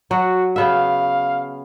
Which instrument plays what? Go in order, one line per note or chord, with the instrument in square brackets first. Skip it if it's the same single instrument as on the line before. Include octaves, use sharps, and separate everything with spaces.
[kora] F#3 [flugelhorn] F#4
[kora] C#3 B3 E5 [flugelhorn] F5